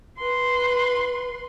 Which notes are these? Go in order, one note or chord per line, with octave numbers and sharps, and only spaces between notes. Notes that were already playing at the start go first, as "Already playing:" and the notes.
B4 C6